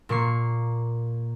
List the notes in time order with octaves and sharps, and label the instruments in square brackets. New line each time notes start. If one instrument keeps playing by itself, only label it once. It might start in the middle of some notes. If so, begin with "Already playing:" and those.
[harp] A#2 A#3 C#6 C7